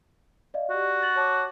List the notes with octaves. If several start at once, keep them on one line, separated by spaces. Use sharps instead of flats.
D5 D#5 F5
F#4 G4 D5
A6 F#7
C#5 A5 D6